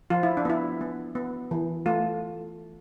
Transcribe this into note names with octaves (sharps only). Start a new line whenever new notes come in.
F3 F4
E4
D4
B3 E4
B3
B3
E3
A3 F4